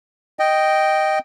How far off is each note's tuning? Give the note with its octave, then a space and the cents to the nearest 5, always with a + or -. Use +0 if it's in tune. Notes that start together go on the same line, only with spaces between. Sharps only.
D#5 +0 G5 -5